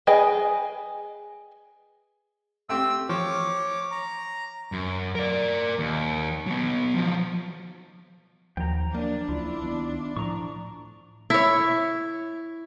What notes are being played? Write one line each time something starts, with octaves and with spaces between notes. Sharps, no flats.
G#4 B4 D#5 G5 G#5
A3 C4 G4 E6
F3 C#5 D6
A#5
F#2
A#4 D5
D#2
F#3 B3
F3 F#3
D#2 F3 F#3 G5 A#5
A#3 D4 D5
C#2 E4 F4
D#3 B3
A2 F3 A#5 C#6
E4 C#5